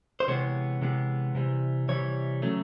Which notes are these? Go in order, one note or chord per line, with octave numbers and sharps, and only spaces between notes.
C5
C3 E3 G#3 B3 C#5
C3 E3 G#3 B3
C3 E3 G3
C3 E3 G3 C#5
C#3 F#3 A3